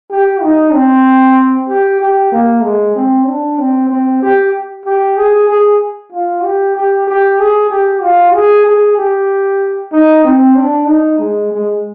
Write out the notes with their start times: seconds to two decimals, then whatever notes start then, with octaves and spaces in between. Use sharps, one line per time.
0.10 G4
0.41 D#4
0.73 C4
1.68 G4
2.00 G4
2.32 A#3
2.63 G#3
2.96 C4
3.27 D4
3.59 C4
3.90 C4
4.22 G4
4.85 G4
5.17 G#4
5.49 G#4
6.13 F4
6.44 G4
6.76 G4
7.07 G4
7.39 G#4
7.70 G4
8.02 F4
8.34 G#4
8.66 G#4
8.97 G4
9.92 D#4
10.24 C4
10.56 D4
10.88 D#4
11.19 G#3
11.52 G#3